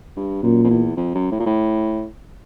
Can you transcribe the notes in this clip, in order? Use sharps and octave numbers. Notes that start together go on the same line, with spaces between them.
G2
F#2 A#2
F2
E2
F2
F#2
A2
A#2
A2